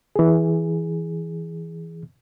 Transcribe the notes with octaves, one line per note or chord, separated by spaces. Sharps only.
E3 G#4